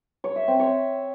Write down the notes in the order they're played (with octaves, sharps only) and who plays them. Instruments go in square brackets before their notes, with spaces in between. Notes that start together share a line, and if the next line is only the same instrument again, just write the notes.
[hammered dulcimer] C#5
E5
C4
C#5